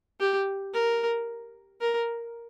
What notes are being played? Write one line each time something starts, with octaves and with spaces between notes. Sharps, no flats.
G4
A#4
A#4